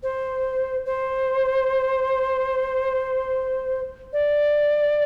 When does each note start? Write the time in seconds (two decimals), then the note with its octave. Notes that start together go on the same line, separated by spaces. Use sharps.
0.03 C5
0.86 C5
4.13 D5